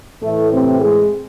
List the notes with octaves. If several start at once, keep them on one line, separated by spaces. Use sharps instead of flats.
A2 E3 A3
C3 C4
G#3 G#4